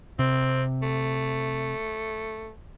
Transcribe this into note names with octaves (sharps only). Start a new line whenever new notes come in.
C3 C4
A3